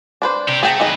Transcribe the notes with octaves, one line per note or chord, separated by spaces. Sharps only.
D4 B4 C5
C3 G4
A3 G#4 G5 A#5
F#2 D#4 G#4 B4 D#5